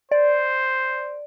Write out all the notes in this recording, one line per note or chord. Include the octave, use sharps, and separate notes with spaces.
C5 D5